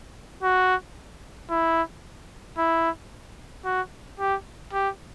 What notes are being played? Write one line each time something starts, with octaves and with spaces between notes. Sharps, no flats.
F#4
E4
E4
F#4
G4
G4